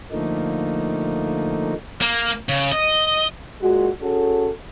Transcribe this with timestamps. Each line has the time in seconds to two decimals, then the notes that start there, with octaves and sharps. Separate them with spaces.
0.12 D3 F3 A3 A#3 D#4
2.01 A#3
2.49 C#3
2.72 D#5
3.62 A#2 G#3 F#4
4.02 C#4 F#4 G#4 A4